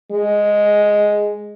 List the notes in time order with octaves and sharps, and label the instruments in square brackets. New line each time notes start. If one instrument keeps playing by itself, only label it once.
[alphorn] G#3